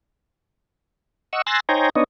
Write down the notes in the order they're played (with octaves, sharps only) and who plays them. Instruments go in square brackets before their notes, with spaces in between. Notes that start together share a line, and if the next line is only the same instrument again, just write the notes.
[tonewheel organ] D#5 F#5 C#6 E6
G#5 C6 E6 F#6 A6 A#6
D#4 C5 C#5 G5 G#5 A#5
B3 D4 D#4 C#5 D#5